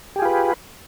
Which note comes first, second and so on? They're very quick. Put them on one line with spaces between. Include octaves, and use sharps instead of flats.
G4 G#4 F4 B4